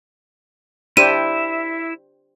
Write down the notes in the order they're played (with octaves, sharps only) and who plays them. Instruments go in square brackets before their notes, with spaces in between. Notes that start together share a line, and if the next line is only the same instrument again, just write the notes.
[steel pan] D4 G4 C5 [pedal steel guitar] E4 E5 [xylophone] D#7